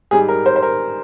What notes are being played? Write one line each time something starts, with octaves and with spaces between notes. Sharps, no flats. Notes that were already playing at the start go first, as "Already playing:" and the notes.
G#2 G3 G#4
A#4
C5
C5
A#4